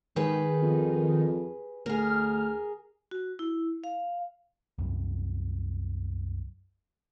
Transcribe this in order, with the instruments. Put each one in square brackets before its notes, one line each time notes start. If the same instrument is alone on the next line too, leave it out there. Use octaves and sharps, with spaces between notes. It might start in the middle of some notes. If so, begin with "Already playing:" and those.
[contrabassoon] G#2 [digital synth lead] D#3 [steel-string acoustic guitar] G4 G#4 B4
[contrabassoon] F2
[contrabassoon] D2 [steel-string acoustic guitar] G#4 A#4 [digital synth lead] F6
[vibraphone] F#4
E4
F5
[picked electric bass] C2 F#2